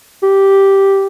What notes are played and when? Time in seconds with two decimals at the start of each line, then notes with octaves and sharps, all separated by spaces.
0.23 G4